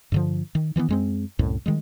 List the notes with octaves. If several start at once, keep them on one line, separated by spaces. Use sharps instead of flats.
G2 D3 F3
D#3
D#3 E3 G#3 B3
F#2 G#3 C4
C2 F#2 A2
D#3 G3 G#3